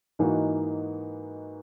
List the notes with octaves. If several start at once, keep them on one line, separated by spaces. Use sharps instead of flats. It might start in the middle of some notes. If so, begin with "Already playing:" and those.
G#2 E3 A#3 D#4 F#4